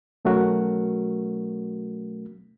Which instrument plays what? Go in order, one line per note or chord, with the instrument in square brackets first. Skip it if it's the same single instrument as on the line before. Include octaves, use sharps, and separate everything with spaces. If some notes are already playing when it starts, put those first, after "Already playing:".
[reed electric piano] B2 F#3 A3 C#4 F#4 A#4